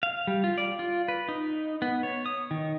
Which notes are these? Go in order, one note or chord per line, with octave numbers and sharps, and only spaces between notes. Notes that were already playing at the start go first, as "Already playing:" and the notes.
F5
G3
F4
D5
F4
B4
D#4
B3
C#5
D#6
D#3